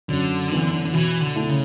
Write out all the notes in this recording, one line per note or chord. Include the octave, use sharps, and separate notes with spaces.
F#2 D3
E3 B3 D4
D3
B2 E3
D3
A3 E4
C#3